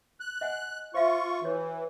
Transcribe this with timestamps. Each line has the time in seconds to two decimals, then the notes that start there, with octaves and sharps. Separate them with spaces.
0.20 F#6
0.41 D#5 F#5 G#5
0.94 F4 C5 E5 F5 C#6
1.42 E3 F#4 C#5